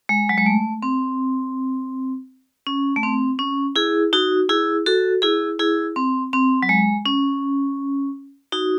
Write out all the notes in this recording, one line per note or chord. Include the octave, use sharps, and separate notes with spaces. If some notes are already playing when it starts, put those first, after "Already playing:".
G#3
F#3
G#3
A3
C4
C#4
A3
C4
C#4
E4 G#4
D#4 F#4
E4 G#4
F#4 A4
E4 G#4
E4 G#4
C4
C4
F#3
G#3
C#4
D#4 F#4